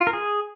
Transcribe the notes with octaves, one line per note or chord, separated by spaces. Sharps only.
F4
A#4
G#4